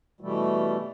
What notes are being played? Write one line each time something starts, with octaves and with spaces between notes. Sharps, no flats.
B2 E3 G3 A3